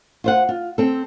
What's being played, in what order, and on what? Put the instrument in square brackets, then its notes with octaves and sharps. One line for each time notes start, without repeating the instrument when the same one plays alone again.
[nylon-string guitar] F4 C5 F#5
F4
C4 A4